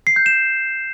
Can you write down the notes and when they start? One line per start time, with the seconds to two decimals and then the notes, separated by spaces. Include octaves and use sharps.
0.07 C7
0.16 G6
0.26 E7